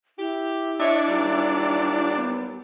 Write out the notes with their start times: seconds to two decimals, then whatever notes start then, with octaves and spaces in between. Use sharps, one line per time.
0.18 E4 G4
0.79 D4 C#5 D#5 E5
1.08 D#2 F#3 G3
2.16 B3